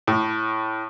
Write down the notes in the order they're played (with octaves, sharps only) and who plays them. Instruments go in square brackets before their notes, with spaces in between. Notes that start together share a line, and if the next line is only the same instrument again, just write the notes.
[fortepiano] A2